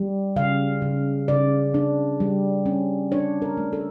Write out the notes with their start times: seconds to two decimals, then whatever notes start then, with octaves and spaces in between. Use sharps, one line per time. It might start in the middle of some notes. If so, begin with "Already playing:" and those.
Already playing: G3
0.36 C#3 F5
0.82 C#3
1.28 C#3 D5
1.74 D4
2.20 G3
2.66 C#4
3.12 D4 C#5
3.42 A#4
3.57 A3
3.73 A4